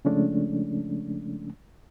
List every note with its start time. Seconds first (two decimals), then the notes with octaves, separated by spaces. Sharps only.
0.05 C#3 F3 G#3 A3 C#4 D4